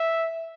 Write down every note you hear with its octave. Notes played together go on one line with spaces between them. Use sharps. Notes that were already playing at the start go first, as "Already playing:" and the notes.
Already playing: E5